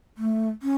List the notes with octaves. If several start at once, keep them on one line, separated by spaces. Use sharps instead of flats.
A3
C#4